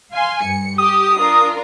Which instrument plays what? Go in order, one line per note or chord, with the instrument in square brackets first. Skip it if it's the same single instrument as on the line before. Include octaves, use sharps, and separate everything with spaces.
[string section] F5 G#5 C6
G2 C#7
[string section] G4 [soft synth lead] D#6
[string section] D4 F4 A#4